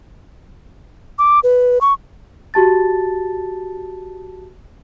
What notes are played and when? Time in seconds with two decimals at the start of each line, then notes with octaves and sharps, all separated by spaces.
1.19 D6
1.44 B4
1.81 C#6
2.54 F#4 G4 A5 A6